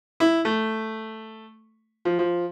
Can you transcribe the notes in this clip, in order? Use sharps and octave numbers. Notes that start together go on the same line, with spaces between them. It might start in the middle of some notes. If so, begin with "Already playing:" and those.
E4
A3
F3
F3